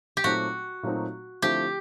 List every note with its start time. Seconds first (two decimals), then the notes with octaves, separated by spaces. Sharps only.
0.17 G4
0.24 A#2 F#3 A3 C4 D#4 F#4
0.83 A#2 F#3 A3 C4 D#4
1.42 D3 F3 A3 C4 E4 G4